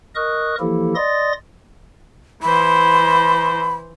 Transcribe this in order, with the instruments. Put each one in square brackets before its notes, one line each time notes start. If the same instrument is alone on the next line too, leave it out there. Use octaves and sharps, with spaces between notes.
[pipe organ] A#4 D#5 C#6 D#6 F#6
E3 F3 A#3 E4 G4 A4
D5 D#5 C6 D#6 A6 A#6
[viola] E3 C5 [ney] B5